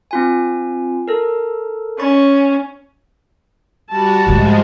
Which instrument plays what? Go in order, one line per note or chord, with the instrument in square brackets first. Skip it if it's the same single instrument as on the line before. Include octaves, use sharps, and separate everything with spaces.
[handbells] C4 F4 G#5
A4 A#4
[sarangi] C#4 [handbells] B5 C#6 A6
[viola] G3 A5 [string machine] F#4
[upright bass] G#2 A3 [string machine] F3 G#3